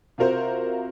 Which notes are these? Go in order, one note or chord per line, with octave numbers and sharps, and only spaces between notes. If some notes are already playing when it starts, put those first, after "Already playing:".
C3 F4 F#4 A#4 C5